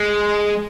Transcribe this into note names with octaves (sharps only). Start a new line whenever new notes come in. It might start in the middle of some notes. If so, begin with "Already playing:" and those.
Already playing: G#3